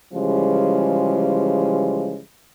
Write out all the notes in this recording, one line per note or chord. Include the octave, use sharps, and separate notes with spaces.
C#3 E3 F3 G3 G#3